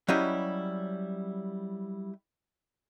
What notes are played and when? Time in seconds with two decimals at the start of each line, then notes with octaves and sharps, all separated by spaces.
0.08 F#3 G3 C#4 E4 G4 D#5